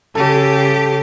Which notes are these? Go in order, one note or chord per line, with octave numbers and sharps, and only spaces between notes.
C#3 G4 A4